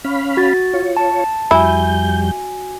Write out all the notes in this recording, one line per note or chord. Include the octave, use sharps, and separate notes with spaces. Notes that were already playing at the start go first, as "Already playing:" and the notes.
C#4 F5 B5
F#4 A6
F4 C#5
A5
F2 G3 E4 F#4 G#5 G6